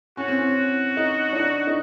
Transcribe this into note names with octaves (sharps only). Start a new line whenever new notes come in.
C#4 F#4
C4
C#4
D#4
D4
D#4
D#4